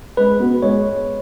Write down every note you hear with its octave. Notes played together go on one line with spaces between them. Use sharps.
G#3 B4
B3 F#4
G#3 C#5